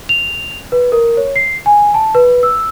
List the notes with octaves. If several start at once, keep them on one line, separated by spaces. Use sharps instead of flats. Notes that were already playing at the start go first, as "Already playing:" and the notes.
F7
B4
A#4
C#5
C7
G#5
A5
B4
E6